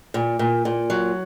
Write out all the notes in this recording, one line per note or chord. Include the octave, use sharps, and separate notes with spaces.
A#2
A#2
A#2
F#3